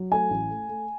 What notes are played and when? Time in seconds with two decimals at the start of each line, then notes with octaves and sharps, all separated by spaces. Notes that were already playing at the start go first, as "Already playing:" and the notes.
Already playing: F#3
0.12 A3 G#5
0.30 A1
0.50 A3
0.69 A3